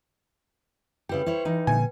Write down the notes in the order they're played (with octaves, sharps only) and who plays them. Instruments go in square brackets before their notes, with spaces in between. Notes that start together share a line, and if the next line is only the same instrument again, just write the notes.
[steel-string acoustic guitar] C#3 E4 G4 [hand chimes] B4 G5
[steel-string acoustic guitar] E4 C5 C#5
E3 D#4
[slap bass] A#2 D3 F3 [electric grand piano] G#5